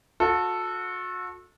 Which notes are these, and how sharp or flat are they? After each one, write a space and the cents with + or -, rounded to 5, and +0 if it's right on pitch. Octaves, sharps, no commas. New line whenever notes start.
F#4 -35 A4 +0